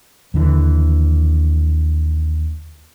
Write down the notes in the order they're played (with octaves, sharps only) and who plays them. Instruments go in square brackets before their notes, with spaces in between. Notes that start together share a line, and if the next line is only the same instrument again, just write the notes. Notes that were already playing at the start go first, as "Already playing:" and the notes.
[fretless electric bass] D#2 D3 E3